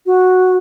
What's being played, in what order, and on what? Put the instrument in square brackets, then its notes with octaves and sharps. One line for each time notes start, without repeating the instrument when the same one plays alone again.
[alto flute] F#4